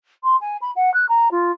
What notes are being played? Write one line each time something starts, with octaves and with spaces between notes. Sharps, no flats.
C6
G#5
B5
F#5
F#6
A#5
F4